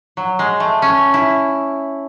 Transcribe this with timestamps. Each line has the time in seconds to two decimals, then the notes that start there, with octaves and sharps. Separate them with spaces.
0.17 F#3
0.39 G#3
0.60 A3
0.82 C#4
1.14 E4